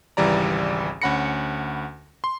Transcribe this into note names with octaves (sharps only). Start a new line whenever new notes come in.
G#1 C#2 E3 G3 D5 A#5
D2 C#4 F#5 B5 A#6 C#7
C6